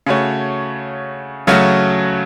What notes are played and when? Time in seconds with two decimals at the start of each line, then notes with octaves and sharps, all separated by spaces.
0.06 C#3 A3 F#4 C#5
1.47 C#3 F#3 A3 C#4 F#4